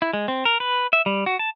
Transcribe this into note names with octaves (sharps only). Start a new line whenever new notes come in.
E4
G#3
C4
A#4
B4
E5
G3
F#4
A5